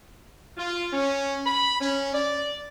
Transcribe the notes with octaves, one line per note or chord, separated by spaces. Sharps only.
F4
C#4
B5
C#4
D5